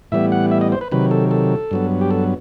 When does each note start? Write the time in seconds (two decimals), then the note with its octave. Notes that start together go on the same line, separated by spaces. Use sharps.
0.12 A2 E3 G3 B3 E5
0.32 F#5
0.51 E5
0.61 D#5
0.72 C5
0.81 B4
0.91 C3 D#3 F#3 B4
1.11 A4
1.31 A4
1.71 G2 F#3 B3
2.01 G4
2.11 A4